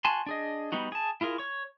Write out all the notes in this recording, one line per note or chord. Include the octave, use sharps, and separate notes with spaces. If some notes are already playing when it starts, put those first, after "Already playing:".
F#4 G#5 A5 C6
D4 G#4 D#5
G3 B3 D#4 F#4
G#4 A5
E4 F4 G#4 A#4
C#5 C#6